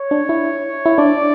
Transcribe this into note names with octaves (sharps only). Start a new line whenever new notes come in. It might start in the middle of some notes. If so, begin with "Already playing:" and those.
Already playing: C#5
D4
E4
E4
D4 D5